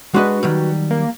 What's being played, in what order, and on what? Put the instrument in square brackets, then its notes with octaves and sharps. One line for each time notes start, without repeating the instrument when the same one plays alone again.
[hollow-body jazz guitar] G#3 D4 D#5 [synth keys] F#4 B4
[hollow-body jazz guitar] D#3 F#3 G3
[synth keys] A#3